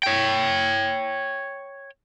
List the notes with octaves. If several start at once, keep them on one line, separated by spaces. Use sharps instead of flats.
C#5 G5